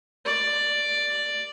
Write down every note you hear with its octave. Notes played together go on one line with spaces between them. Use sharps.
D5